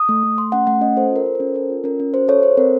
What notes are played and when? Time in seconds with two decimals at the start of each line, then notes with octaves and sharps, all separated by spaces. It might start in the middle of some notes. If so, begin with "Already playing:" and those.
Already playing: D#6
0.09 A3
0.23 A3
0.38 A3 C6
0.52 C#4 F#5
0.67 A3 F#5
0.81 C#4 D#5
0.97 A4 C5
1.11 F4 A#4
1.26 A4
1.35 C#4 C5
1.55 A4 A#4
1.70 F4
1.84 C#4 A#4
2.00 C#4
2.14 F#4 C5
2.28 A4 C#5
2.43 A4 C5
2.57 C4 A#4